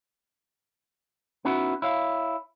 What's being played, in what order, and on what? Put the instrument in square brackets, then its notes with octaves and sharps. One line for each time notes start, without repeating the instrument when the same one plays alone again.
[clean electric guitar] B3 C#4 D#4 E4 F#4
E4 C#5 F5